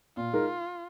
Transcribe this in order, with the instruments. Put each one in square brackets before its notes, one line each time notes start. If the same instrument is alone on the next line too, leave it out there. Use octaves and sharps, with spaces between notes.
[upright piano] A#2 [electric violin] F4
[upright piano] G#3 D#4 A#4